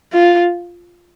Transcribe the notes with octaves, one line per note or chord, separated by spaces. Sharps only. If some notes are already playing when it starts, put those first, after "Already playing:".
F4